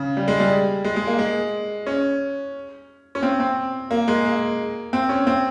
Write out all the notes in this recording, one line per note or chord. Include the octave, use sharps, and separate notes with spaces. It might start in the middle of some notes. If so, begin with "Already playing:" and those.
Already playing: C#3
G3
G#3
G3
G#3
G#3
A#3
G#3
C#4
C#4
C4
C4
A#3
G#3
A#3
C4
C#4
C4